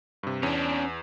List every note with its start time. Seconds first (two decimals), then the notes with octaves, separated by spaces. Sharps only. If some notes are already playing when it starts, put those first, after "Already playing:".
0.23 G2 C3
0.43 E2 C#4 D4